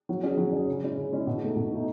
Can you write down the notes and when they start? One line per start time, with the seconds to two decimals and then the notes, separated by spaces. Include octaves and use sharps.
0.09 F#3
0.23 C#4 G#4
0.37 F#3
0.53 C#4 G#4
0.67 C#3
0.83 G#3 C#4 E4
0.97 C#3
1.12 G#3 C#4 E4
1.27 B2
1.42 A3 D#4
1.56 B2
1.72 A3 D#4